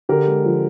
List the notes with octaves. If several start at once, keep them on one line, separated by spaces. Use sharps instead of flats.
D3 G4 A#4
G#3
F3